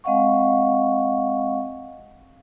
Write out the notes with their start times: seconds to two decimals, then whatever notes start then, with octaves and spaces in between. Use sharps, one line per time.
0.04 G#3 C4 D#5 F5 F#5 C#6